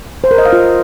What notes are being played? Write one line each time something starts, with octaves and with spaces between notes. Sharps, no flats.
C5
A#4
D#5
F5
F4